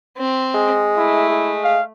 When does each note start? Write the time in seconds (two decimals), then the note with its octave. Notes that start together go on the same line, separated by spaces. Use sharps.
0.17 C4
0.54 G#3
0.97 A3 E4
1.29 G#3
1.64 F5